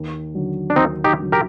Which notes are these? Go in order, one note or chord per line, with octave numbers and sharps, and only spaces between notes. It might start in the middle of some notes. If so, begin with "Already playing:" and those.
Already playing: D#2
D3 F#3
D4
D#2 C4 D#4
D#4 G4
D3 F#3
G4 A#4